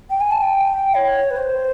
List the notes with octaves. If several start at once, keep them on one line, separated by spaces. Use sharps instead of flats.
G5
G#5
A5
G5
C#5
B4
C5